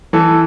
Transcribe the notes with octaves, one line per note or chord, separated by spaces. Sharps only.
E3 A4